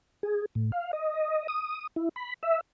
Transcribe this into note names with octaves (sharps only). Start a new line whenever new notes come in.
G#4
A2
F5
D#5
D#6
E4
B5
E5